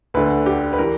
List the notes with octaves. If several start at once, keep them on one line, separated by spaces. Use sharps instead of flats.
D2 D3 B4
G4
B4
E3 A#4